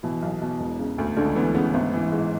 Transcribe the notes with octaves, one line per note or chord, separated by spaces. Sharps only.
B2 E3 E4
B1
B2
E1
C#3
D2
C#2 D3 D4
E3 B3
C#3 B3
G#1 B3
E3
G#2